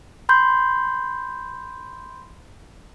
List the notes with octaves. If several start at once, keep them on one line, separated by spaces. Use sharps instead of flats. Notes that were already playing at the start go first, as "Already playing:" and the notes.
B5 C6 G6